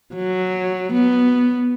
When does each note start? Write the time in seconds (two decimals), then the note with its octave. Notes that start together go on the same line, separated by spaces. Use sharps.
0.14 F#3
0.93 B3